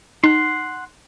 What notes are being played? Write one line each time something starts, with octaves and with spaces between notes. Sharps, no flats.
D#4 F#5 C6